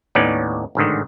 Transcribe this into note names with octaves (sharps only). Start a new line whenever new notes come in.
D#2 A2 B3 C#4 D#4 D5
A1 G#2 D3 D#3